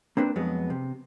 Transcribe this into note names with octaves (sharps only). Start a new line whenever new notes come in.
A#3 C4 D4 B4 C5
F2 F#3 G#3 B3
C3